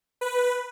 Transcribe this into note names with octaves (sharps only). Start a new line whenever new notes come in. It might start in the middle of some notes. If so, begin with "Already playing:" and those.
B4